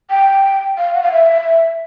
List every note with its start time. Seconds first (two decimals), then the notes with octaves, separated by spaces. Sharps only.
0.10 G5
0.78 F5
0.94 F#5
1.03 F5
1.12 E5